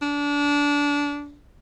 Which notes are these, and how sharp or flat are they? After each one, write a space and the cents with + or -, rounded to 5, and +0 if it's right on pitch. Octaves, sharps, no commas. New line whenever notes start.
D4 -25